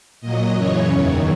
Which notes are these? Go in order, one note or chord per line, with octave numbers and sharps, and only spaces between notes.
A#2 F#3 D#5
F#2 C#3 E3 C#5
E2 D#3 F#3